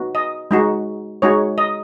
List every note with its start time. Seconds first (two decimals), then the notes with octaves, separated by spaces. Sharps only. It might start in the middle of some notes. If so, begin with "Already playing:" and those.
Already playing: B3 D#4 F#4
0.15 D#5
0.51 G#3 D#4 F#4
1.22 G#3 D#4 F#4 C#5
1.58 D#5